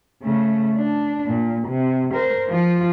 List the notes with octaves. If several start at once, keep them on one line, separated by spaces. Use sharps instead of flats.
C#3 A3
D4
A#2
C3
A#4 C5
F3 F4